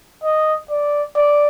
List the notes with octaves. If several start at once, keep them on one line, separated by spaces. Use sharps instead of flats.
D#5
D5
D5